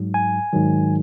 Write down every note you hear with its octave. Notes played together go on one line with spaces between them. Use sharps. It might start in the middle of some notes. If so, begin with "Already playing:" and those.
Already playing: G#2 F#3
G#5
G#2 D#3 F#3